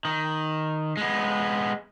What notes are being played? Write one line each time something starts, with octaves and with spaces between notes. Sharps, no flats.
D#3
G#3 B3